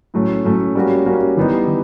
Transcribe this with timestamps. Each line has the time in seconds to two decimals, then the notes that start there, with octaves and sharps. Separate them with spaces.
0.14 A2 F#3 A3 C#4
0.45 A2 F#3 A3 C#4
0.75 G3 A#3 C#4 F#4
1.06 G3 A#3 C#4 F#4
1.37 E3 G3 B3 D#4
1.67 E3